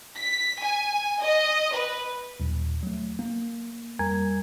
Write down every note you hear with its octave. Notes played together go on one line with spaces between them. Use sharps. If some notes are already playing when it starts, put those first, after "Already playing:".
B6
G#5
D#5
B4
D#2 A#2 F#3
F#3 A3
A#3
F2 G3 A#4 G#5 A#5 G#6